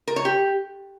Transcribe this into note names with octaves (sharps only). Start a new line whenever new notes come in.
A#4
C#5
G4